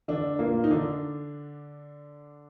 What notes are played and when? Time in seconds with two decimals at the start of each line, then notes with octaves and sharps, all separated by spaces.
0.08 D3 D4
0.39 A#2 A#3
0.64 D#4
0.70 D3 D4